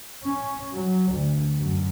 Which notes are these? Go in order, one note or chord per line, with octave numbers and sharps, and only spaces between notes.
C#4
F#3
D2
F#2